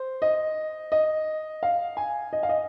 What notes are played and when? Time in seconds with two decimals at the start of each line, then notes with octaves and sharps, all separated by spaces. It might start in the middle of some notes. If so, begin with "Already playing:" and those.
Already playing: C5
0.22 D#5
0.92 D#5
1.63 F5
1.97 G#5
2.33 D#5
2.43 F5
2.49 D#5